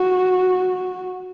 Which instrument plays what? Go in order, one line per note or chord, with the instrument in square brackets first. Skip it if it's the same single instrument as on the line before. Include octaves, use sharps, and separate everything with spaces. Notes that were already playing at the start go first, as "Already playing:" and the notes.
Already playing: [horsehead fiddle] F#4